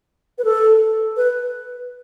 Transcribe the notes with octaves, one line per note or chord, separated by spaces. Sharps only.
B4
A4
B4